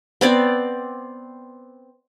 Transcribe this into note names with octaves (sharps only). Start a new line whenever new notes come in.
B3 C4 D5